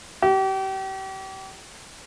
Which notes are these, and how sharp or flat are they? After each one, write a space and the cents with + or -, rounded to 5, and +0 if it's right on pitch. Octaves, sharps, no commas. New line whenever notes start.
G4 -35